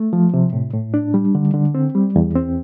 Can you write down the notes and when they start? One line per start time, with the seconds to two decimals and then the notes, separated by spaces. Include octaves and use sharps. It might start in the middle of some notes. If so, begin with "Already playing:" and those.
Already playing: A3
0.13 F3
0.34 C3
0.53 A2
0.73 A2
0.94 D4
1.14 G3
1.35 D3
1.54 D3
1.75 C4
1.95 G3
2.16 E2
2.35 C4